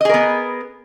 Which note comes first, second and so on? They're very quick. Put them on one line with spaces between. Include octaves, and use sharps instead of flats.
D#5 G#4 A#4 B3